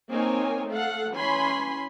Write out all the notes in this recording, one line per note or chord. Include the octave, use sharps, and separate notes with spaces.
A#3 C4 D#4 A#4 C#5 G#5
A3 A4 F5 F#5
E3 C#4 G#5 B5 C6